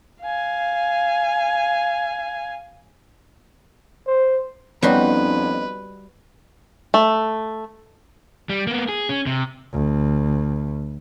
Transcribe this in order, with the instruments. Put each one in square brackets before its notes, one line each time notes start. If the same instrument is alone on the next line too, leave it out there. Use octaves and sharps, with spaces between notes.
[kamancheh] F5 G#5
[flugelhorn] C5
[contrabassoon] F2 [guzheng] G3 F#4 C6 [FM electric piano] B3 C#4 D#4 [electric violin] B4
[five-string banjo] A3
[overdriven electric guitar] G3
A#3 B3
G#4
C#4
C3
[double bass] D2